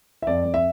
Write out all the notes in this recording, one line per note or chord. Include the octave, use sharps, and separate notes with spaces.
E5
F2 D5
F2
E5